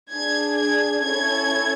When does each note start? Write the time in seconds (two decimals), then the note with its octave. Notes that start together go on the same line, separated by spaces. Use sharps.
0.11 D4 G#4 G#6
0.57 G#6
1.03 C#4 E4 A4 G#6